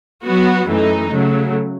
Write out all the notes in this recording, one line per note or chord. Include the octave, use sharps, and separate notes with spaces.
F#3 B3 F#4
F#2 E3 A3 D#4
C#3 F#3 A3